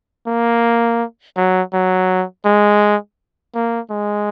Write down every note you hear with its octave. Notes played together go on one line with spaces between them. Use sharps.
A#3
F#3
F#3
G#3
A#3
G#3